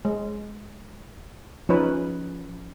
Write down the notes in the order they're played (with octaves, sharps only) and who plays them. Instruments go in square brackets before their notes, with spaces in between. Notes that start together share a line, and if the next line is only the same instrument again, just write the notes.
[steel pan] G#3
[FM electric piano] F3 [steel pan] C#4 D#4 B4